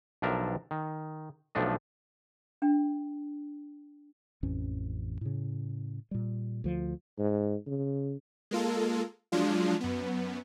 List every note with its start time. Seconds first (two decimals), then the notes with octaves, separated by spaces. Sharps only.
0.22 B1 F3 D4 A#4 E5
0.71 D#3
1.55 B1 F3 A3 D4 D#5
2.62 D4 G5
4.43 A1 F2 E3 C#4
5.21 A2 C#3
6.11 A#2 G3
6.64 D2 F3
7.19 G#2
7.67 C#3
8.51 G#3 A#3 F4 A4
9.32 F3 F#3 G#3 D4 F4
9.81 F#2 B3